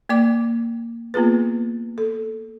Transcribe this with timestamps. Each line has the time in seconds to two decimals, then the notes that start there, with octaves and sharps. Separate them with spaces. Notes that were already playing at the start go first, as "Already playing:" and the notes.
0.09 A#3 D5 G5 D6
1.14 A#3 B3 F4 G#4 B4
1.98 A4